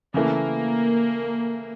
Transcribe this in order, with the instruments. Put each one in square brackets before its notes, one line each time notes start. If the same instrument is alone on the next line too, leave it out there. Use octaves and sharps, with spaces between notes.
[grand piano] C#3 E3 A3 [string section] A#3